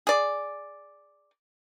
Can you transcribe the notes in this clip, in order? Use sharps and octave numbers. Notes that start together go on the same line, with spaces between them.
G#4 D5